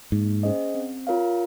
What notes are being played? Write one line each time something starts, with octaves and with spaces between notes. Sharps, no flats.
G#2 A#3
C#4 G#4 C5 D#5
C4
F4 A#4 C#5 F5